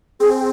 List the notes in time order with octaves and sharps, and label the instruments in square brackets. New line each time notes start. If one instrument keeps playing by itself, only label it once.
[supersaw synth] C4 [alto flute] G#4